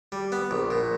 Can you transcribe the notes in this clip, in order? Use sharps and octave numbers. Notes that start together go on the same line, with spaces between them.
G3
B3
A#1
A#2